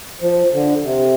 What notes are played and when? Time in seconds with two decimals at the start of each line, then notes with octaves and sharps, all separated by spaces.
0.21 F3
0.52 D3
0.82 C3